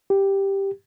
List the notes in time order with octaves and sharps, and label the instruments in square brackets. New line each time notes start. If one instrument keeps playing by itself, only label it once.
[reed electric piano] G4